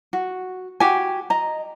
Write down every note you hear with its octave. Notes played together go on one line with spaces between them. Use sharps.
F#4
F#4 G4 G#5
D#5 A#5